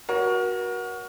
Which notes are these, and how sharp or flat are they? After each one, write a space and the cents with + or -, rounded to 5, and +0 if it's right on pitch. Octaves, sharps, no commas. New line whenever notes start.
F#4 +0 A#4 +35 C#5 +15